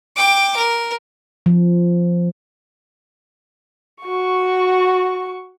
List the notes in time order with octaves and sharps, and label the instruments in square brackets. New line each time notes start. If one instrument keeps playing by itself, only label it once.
[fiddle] G5 D6
A#4
[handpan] F3
[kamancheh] F#4 C#6